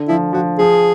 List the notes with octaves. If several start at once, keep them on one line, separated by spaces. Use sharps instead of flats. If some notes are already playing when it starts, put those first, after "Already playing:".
Already playing: D3
F3 E4
F3 F#4
F3 G#4